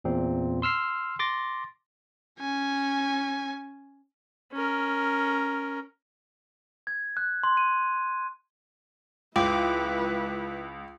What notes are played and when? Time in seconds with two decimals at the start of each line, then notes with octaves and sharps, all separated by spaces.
0.04 E2 A#2 C4
0.62 C6 E6 F6 C7
1.19 C6 D6 A6 A#6
2.39 C#4 G#5
4.52 C#4 A#4
6.87 G#6
7.17 F#6
7.43 C6
7.57 D#7
9.36 C#2 E4 F4 B4 G5 D6